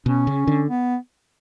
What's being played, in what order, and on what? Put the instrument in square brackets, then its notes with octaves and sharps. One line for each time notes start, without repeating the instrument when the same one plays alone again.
[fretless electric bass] B2 [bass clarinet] C#4
[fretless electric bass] C#3
D3
[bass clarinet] B3